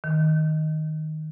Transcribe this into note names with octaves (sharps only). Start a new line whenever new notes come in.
D#3